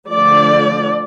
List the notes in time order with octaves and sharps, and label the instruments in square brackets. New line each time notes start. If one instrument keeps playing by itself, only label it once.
[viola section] D3 F3 A3 D5